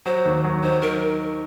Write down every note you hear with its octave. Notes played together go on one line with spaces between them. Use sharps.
F#3 C5
D#2
F#3
D#3 C5
D#3 A#4